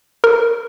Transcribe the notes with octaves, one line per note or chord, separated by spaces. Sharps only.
A#4